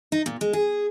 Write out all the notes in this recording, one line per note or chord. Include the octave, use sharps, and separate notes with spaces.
D#4
A#2
G#3
G#4